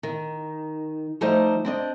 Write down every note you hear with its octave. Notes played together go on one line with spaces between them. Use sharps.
D#3
F3 G3 A3 D#4 C5 D#5
C4 D4 D#5